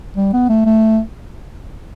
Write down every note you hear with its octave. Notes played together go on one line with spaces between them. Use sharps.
G3
B3
A3
A3